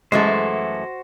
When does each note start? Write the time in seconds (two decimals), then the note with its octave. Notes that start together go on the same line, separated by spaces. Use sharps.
0.12 F#2 E3 G#3 A3 F#4 C5